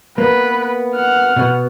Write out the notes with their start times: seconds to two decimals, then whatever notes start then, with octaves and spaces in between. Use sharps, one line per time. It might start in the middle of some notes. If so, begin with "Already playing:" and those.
0.18 A#3 B3 B4
0.95 F#5 F6
1.36 B2 B3